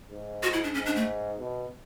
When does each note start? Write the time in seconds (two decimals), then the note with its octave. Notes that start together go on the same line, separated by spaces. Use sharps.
0.11 G#2
0.43 F#4
0.53 E4
0.64 D4
0.74 G#2 C#4
0.86 D4
0.96 A3
1.39 B2